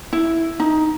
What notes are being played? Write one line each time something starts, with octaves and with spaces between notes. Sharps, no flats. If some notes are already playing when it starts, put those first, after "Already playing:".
E4
D#4